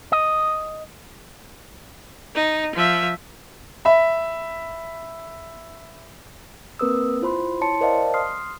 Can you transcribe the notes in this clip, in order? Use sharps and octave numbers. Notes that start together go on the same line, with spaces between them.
D#5
D#4
F3 E5
E5 B5
A#3 C4 A#4 B4 D#6 E6
E4 F4 C5 B5 C6
E4 C#5 A5 C6 C#7
A#4 C5 D5 D#5 F5 A5
C6 D#6 F6 C7